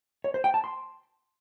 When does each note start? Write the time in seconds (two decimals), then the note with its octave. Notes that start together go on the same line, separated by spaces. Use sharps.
0.24 C#5
0.34 C5
0.44 G5
0.54 A5
0.64 C6